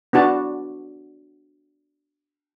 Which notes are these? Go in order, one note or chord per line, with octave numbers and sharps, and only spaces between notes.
B3 D4 F#4 A5